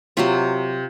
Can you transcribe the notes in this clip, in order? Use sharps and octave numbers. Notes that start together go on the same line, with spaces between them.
C3 F#3 C4 F4